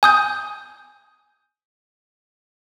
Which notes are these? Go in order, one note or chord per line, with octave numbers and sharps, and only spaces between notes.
G#5 D#6 G6